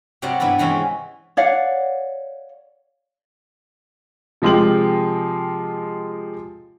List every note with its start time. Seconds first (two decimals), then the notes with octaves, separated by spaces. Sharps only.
0.22 C3 F#3 G3 C4 D5 F#5
0.40 G2 B3 E4 B4 D5
0.58 C3 E3 G#3 C4 C#4
1.37 C#5 D5 F5 F#5
4.42 C3 F3 G#3 F4 G5 F#7